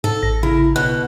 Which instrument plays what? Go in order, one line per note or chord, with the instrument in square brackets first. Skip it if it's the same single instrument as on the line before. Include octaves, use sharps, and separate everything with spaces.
[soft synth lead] G#2 [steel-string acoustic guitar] A4
[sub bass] A1 [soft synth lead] A#6
[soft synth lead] C#3 [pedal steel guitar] E4 [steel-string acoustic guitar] A#4
[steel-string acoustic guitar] B2 [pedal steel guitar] F#6